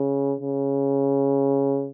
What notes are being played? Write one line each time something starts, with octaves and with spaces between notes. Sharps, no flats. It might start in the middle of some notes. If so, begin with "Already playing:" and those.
Already playing: C#3
C#3